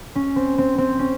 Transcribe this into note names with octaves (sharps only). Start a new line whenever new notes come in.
C#4
C4
C4
C4
C#4